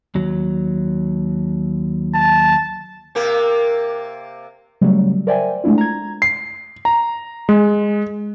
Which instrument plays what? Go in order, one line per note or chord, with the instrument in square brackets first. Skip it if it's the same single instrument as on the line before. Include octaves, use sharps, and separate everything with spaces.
[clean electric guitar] D#2 F#3
[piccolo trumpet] A5
[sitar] C3 A#3 A#4
[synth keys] C#3 F#3 G3 A3
A#4 C5 D5 E5 G5 G#5
G#3 A3 D4 E4 F4
A#5 G#6
[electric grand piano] C7
A#5
G#3